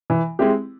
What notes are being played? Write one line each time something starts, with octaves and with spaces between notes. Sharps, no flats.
E3
G#3 C4 E4 G4